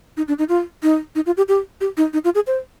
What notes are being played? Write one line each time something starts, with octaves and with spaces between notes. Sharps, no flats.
D#4
D4
D#4
F4
D#4
D#4
F4
G4
G4
G4
D#4
D#4
F4
G#4
C5